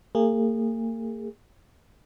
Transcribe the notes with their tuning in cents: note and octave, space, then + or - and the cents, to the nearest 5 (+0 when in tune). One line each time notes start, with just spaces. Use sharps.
A#3 -40 G#4 -25